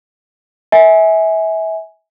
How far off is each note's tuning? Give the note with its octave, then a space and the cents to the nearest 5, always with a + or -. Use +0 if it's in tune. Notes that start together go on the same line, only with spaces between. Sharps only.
E5 -25 G#5 +0